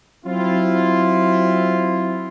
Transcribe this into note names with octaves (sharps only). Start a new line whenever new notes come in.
F#3 C4 E4 F4